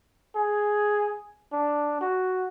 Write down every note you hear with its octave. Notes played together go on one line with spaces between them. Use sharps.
G#4
D4
F#4